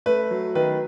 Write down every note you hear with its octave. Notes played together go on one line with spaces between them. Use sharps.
A3 B4
F#3
D#3 B4